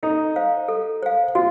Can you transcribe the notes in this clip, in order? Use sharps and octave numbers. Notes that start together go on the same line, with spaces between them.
D#4 A4
C5 F5
A4
C5 F5
F4 F#4